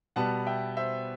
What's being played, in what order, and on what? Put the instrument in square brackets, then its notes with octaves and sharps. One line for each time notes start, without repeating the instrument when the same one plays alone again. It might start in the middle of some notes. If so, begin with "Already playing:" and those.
[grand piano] B2 G3 B3 F#5 A5
E5 G5
C5 E5